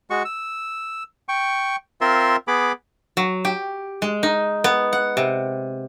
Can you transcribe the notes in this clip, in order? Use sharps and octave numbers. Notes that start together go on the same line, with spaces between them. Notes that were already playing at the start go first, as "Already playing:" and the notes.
G#3 F#4 C#6
E6
G5 C#6
C4 F4 A#4 E5 C6
B3 G#4 B5 D6
F#3
G4
G#3
D#4
B3
F#5
C3